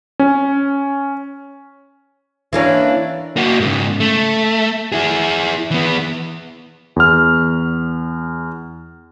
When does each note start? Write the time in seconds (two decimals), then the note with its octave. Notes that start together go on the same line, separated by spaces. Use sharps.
0.19 C#4
2.53 E3 A#3 C#4 D4 E4
3.36 A#3 F#4
3.60 G#2 C#3
4.00 A3
4.92 E4 G#4
5.71 E3 B3
6.96 E2 F6